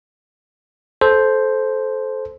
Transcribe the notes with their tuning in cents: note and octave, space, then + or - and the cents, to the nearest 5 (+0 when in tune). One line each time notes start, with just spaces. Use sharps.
A4 -20 C5 +0